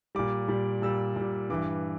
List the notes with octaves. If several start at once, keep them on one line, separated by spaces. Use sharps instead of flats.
A#2 G3 D6
A#2 G3
A#2 G3 E6
A#2 G3
G2 E3 G3 D6